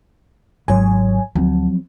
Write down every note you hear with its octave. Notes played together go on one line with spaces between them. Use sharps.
G#1 G#2 F#3 C#5 G#5
D2 F3 F#3 C4